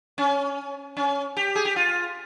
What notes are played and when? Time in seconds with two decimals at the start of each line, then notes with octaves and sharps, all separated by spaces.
0.18 C#4
0.97 C#4
1.37 G4
1.56 G#4
1.65 G4
1.76 F4